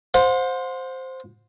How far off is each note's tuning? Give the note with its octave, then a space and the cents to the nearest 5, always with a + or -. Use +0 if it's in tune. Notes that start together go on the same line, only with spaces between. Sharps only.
C5 +0 F#5 -45